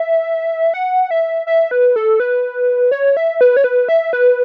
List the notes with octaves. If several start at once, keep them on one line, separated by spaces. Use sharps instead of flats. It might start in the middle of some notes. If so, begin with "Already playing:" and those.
Already playing: E5
F#5
E5
E5
B4
A4
B4
C#5
E5
B4
C#5
B4
E5
B4